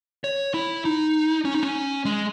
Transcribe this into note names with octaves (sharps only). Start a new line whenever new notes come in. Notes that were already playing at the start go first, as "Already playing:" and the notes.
C#5
E4
D#4
C#4
D#4
C#4
G#3